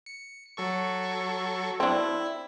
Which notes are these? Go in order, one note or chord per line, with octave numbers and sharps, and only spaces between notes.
C#7
F#3 A4 C#6
C4 D4 E4